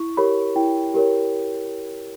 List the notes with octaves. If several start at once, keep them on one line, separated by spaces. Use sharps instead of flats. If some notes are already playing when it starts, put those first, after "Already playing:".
Already playing: E4 C#6
G4 A#4 C#5 B5
E4 G5
G4 A#4 C#5